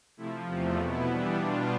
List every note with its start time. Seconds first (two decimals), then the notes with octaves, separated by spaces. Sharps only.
0.17 C3 F3 A3 E4
0.47 E2 C3 F3 A3
0.76 B2 B3 E4
1.06 E3 G3 B3 D4
1.35 B2 G3 D4 F4